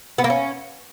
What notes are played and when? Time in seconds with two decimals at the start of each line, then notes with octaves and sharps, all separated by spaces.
0.18 B3
0.24 A#3
0.30 C#4